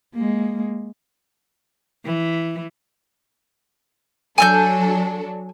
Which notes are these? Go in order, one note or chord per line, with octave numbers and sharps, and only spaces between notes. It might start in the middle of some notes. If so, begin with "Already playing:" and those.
G#3 A#3
E3
F#3 D4 A4 G#5 E6 G6